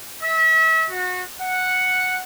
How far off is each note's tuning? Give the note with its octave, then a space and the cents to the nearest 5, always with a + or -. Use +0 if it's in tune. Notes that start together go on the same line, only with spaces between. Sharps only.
E5 -35
F#4 -25
F#5 -5